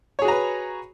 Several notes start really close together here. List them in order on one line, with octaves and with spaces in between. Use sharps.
C#5 G#4 F#4 A#5 B4